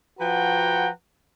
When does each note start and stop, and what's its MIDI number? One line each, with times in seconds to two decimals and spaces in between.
0.20 0.89 53
0.20 0.89 66
0.20 0.89 71
0.20 0.89 78
0.20 0.89 79
0.20 0.89 82